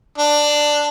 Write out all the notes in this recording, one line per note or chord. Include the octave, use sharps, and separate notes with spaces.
D4